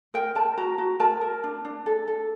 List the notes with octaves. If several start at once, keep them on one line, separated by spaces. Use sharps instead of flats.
A#4 G5
A#4 A5
F#4 A#5
F#4
A#4 A5
A#4
D4
D4
A4
A4